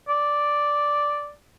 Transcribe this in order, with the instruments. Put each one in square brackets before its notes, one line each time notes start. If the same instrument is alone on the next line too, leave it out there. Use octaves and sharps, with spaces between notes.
[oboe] D5